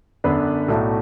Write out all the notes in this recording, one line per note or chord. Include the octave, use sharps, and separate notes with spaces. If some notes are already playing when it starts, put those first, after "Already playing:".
F#2 D3 B3 D4 B4
B1 A2 A3 D4 F#4